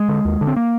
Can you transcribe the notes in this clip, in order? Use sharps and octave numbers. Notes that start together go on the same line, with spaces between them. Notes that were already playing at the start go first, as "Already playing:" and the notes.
Already playing: G#3
D3
D#2
D3
C4
A#3